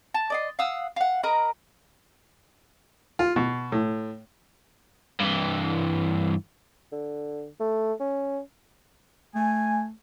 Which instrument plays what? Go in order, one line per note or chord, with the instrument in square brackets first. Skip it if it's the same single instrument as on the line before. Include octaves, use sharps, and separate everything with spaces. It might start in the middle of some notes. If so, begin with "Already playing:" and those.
[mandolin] A5
D5 D#5 C6
F5 F#5 D#6 E6
F5 F#5
A#4 D#5 A#5 B5
[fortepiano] F4
B2
A2
[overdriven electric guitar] G2 E3
[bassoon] D3
A3
C#4
[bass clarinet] A3 [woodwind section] G#5